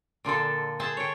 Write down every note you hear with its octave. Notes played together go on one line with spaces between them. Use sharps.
A#2 D3 F3 A4
G#4 C5 E5 A5
C#5 G5